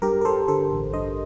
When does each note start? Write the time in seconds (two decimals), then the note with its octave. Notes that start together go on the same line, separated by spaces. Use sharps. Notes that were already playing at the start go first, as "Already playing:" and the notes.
0.02 G2 G4 A#4
0.21 A#4
0.25 G3 A4 C5
0.48 D3 A4 C5
0.72 A1
0.93 G2 C5 D#5